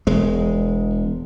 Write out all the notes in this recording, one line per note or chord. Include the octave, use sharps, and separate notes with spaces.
E1 G#3